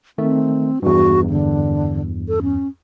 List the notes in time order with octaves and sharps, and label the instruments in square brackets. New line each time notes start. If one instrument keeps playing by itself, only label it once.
[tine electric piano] D#3 A3 [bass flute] C4
[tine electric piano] E2 G2 [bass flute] F#4
[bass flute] D3
A4
C#4